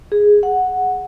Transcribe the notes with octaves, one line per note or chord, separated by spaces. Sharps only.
G#4
F#5